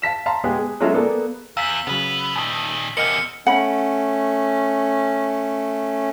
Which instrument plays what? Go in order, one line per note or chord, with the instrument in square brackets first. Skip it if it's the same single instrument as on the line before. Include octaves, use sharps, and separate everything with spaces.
[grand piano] F5 A5 B6 E7
F5 A5 A#5 C6
G#3 B3 G4 G#4
G#4
F#3 G#3 C#4 F4 A4 E5
A#3 B3 G#4 A4 D5
[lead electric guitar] E2 [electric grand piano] F5 [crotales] E6 B6
[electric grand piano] C#3 F#3 [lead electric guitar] B3 B4
[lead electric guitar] A#2 D#3 [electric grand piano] A5 D#6
[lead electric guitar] E2 C3 [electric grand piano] A#4 D#5 F#5 [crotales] F6 C#7
[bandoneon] A3 [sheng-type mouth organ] C#4 [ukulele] F#5 B5